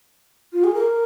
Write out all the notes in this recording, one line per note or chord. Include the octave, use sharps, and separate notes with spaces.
F4
G#4
A#4